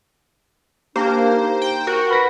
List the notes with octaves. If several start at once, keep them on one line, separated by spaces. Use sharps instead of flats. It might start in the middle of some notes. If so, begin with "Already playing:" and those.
A#3 D4 G4 C5
D#4
G5
F#4 A#4
B4 B5 A#6 B6